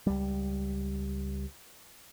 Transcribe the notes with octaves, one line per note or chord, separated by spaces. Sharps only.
C#2 G3